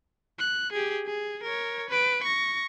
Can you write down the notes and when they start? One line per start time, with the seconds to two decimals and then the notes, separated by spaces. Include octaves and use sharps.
0.39 F#6
0.72 G4 G#4
1.06 G#4
1.43 A#4 C#5
1.89 B4 D7
2.23 C#6 A#6